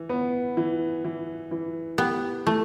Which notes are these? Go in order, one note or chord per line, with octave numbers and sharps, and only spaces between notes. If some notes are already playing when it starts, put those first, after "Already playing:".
Already playing: E3
B3
E3
E3
E3
B3 G4
E3 A3